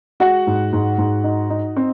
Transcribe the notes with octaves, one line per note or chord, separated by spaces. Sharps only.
G#3 F#4 F#5
G#2
G#2
G#2
D#4
D#4
C4